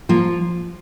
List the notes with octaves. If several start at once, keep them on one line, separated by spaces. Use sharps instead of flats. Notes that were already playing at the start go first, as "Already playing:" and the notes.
F3 A#3